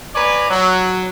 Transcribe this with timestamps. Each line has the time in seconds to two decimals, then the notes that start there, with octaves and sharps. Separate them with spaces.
0.15 B4 C#5 D5 G#5 A#5
0.50 F#3